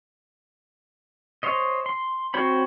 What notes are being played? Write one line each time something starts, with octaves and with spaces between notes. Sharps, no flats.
C5 C#5 D#5
C6
C4 F#4 C5 C#5 B5